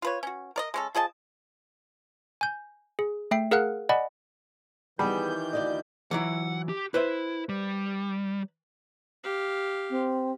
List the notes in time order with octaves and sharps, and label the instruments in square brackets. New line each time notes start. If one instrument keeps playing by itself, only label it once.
[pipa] F4 B4 C#5
C#4 F#4
A#4 D5 D#5
G#3 C#4 A4
F3 G#4 D#5 A5
[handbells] G#5 G6
G#4
A3 E5 G5 C7
G#4 A#4 F5 F#5 F6 F#6
D5 D#5 F#5 G#5 B5
[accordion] D#3 E3 G6 [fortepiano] G3 [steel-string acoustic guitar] B3 G#4
[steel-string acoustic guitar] D2 D5 D#5
[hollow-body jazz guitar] E3 F#3 E4 [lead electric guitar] F#5
[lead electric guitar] G4
[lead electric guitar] E4 [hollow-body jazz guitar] B4 C5 E5
[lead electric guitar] G3
[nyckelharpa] G4 F5
[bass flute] C4